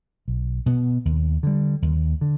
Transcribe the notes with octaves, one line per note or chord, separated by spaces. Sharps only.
B1
B2 B3
D#2
D3 G3
D#2
D3